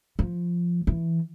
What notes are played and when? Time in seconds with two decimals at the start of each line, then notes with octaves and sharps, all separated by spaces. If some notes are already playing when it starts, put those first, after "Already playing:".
0.19 F3
0.87 E3